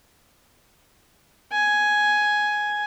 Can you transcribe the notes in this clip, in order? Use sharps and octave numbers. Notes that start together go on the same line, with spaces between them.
G#5